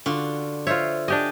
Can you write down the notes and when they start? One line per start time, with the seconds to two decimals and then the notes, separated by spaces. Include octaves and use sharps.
0.06 D3 F4 F#4
0.67 F4 C5 C#5 E5
1.08 D4 G4 D#5 G#5